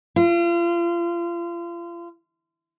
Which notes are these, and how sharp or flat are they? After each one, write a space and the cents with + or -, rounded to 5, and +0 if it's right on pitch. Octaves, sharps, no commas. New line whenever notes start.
F4 -35